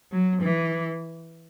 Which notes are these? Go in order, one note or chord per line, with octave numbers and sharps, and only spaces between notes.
F#3
E3